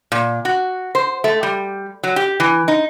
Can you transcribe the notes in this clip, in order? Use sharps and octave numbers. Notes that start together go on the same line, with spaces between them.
A#2
F#4
C5
A3
G3
F#3
G4
E3
D#4